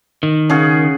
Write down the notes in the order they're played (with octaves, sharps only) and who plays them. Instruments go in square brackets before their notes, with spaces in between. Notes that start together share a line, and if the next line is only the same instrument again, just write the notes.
[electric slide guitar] D#3
[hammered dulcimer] C#3 G#4 F#5